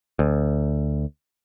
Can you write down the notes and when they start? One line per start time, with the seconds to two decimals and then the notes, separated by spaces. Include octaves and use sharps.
0.19 D2